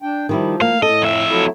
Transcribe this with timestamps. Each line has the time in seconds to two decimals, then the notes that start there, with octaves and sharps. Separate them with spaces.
0.02 D4 G5
0.29 D#3 F3 G3 E4
0.61 A#3 F5
0.83 A2 A4 D#5
1.02 F2 E5
1.29 F#3 A3 E4